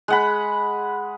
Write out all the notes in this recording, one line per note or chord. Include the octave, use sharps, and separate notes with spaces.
G#3 F#5 B5